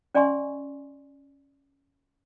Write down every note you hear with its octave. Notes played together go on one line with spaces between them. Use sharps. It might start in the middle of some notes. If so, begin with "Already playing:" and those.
C#4 D5 D#5 G#5 C6 C#6